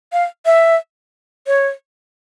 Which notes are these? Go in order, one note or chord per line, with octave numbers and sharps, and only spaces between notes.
F5
E5
C#5